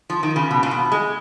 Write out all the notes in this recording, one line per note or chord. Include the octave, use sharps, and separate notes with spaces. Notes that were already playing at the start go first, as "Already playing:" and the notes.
F3
D#3
C#3
B2
A#2
B2
G#3